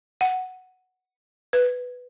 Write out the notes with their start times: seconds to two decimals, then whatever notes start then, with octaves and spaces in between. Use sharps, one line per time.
0.21 F#5
1.53 B4